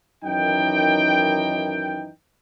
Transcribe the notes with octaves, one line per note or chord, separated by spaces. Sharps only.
F#2 D#3 E3 D#4 G5